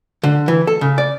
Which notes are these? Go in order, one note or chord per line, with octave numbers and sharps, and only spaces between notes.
D3
E3
A4
C#3
D5